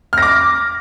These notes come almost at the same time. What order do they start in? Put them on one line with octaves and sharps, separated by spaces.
F6 A#6 D6